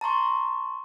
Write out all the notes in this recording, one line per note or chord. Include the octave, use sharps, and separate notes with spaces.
A5 A#5 C6 C#6